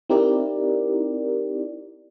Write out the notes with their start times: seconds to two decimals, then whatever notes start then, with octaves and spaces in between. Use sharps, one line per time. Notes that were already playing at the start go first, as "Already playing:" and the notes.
0.10 C4 D#4 E4 G4 A#4 D5